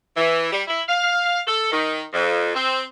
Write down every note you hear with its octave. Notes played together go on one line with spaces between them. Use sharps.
E3
G3
E4
F5
A4
D#3
F2
C4